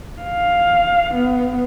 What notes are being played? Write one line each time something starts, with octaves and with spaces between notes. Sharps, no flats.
F5
B3